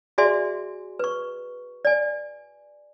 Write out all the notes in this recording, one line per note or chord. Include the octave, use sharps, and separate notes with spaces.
F#4 G#4 D5 E5 G#5 C6
B4 C#6
D5 G#5